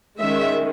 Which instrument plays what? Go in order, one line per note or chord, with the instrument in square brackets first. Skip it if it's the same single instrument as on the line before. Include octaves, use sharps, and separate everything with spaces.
[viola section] D#3 G#3 C#4 E5